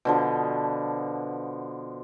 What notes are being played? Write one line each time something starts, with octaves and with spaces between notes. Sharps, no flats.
B2 D3 F3